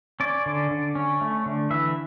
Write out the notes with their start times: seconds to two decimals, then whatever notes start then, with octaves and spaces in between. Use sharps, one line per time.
0.20 C#4 D5
0.46 D3
0.71 D3
0.95 C#4
1.21 A3
1.46 D3
1.70 E3 E5